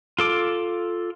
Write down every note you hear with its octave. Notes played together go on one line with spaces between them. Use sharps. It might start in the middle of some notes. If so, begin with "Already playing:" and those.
F4 A4 D6